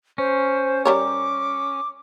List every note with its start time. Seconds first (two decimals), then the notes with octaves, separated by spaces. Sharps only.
0.18 C#4 C5
0.85 G3 A#4 C#5 D6